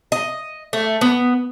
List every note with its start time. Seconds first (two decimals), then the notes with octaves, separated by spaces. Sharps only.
0.12 D#5
0.73 A3
1.01 B3